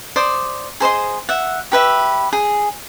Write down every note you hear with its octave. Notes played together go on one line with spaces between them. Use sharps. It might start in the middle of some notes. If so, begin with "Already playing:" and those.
C5 D5 D#6
G#4 C5 D#5 C6
E5 F#5
G4 B4 E5
G#4